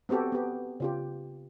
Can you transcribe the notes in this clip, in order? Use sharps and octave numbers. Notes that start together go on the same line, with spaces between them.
B3 C4 F#4 G4 A4
B3 G4
C#3 F4 G4